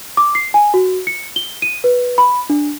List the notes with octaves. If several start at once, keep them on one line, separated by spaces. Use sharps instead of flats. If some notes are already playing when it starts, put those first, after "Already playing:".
D6
C7
G#5
F#4
C#7
G7
D#7
B4
B5
D4